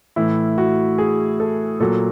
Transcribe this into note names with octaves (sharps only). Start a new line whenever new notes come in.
A2 E3 E4
F#4
G#4
A4
A#2 F#3 A4